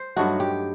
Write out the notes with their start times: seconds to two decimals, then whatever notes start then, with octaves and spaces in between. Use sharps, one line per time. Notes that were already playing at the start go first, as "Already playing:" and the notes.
Already playing: C5
0.16 G2 F#3 A3 D#4 F#4
0.40 G4